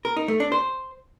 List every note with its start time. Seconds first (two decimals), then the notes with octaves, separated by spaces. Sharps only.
0.05 A#4
0.17 D#4
0.28 A3
0.40 D4
0.52 C5